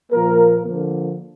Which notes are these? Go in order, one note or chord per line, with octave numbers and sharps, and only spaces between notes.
A#2 F3 A#3 A#4
D3 F3 A#3